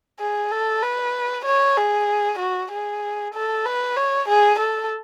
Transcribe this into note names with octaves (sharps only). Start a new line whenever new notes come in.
G#4
A4
B4
C#5
G#4
F#4
G#4
A4
B4
C#5
G#4
A4